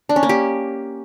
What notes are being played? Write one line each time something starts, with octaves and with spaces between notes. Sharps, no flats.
D4
C#4
A#3
G4